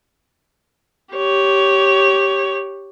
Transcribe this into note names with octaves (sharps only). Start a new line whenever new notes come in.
G4 C#5